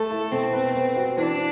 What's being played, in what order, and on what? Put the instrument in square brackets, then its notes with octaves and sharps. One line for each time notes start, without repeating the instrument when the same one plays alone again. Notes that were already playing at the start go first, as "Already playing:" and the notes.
Already playing: [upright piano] A3 [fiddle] A4
[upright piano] E4
[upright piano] B2 [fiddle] C4
[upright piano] B4
B3
F#4
[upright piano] E3 [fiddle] D4